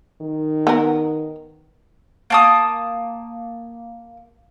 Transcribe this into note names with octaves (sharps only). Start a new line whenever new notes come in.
D#3
B3 A#4
A#3 A5 D#6